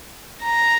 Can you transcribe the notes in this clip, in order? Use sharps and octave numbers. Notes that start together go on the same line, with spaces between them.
A#5